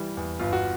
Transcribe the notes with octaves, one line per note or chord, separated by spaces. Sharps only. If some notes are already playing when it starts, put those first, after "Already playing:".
Already playing: E3 G3
E2
G1 F4
F#4